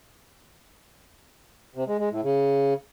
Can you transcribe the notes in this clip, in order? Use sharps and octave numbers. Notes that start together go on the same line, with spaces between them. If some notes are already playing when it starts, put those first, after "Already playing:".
C3
G#3
G#3
A2
C#3